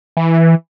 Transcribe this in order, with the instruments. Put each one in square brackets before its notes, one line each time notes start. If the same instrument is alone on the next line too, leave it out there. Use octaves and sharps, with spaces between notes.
[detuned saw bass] E3